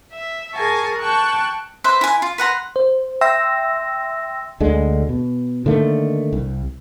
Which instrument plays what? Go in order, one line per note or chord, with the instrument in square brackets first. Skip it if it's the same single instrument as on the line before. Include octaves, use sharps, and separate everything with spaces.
[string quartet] E5
G#4 A#4 G#5 A5 C#6
G5 A5 C#6 F#6
[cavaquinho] B4 C5 E5
E4 G#5
F4
B4 F#5 A#5 C6
[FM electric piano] C5
E5 G5 C6 E6 A#6
[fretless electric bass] D2 D3 G#3
B2
D3 D#3 A3 A#3
C2